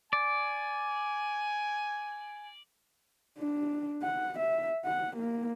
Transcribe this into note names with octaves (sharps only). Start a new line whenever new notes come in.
D5 G#5
D4
F#5
E5
F#5
A#3